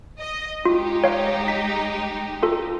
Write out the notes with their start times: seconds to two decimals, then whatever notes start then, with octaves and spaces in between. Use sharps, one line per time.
0.18 D#5
0.65 G#3 D#4 F4 G4
1.04 C#5 F5
1.48 B6
2.43 F4 A4